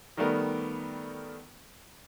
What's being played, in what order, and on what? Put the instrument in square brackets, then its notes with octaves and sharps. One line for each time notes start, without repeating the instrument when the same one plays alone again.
[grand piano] D#3 G3 A3 B3 A#4